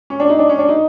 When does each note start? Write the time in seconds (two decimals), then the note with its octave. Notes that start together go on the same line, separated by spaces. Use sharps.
0.10 C#4
0.20 D4
0.29 D#4
0.39 D4
0.49 C#4
0.59 D4
0.69 D#4